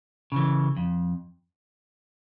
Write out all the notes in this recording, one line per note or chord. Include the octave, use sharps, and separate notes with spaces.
C#3 E3
F2